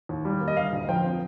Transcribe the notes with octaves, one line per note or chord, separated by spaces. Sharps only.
D#2
G3
A#3
D#5
D3 F5
D2
F3 G5
C4